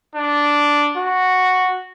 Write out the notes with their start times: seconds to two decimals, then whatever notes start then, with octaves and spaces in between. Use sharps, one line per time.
0.16 D4
0.97 F#4